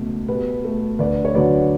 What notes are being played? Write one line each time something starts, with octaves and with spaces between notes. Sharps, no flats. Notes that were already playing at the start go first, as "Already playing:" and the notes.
Already playing: C#2 B2 A3
B2 G4 B4
A3
D2 B4 D5
C#5
D3 F#3 B4 D5